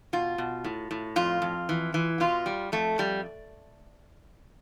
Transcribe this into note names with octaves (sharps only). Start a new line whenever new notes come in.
B2 F4
B2
A2
A2
F2 F4
F2
E3
E3
B2 F4
G3
F2 A3
F2 G3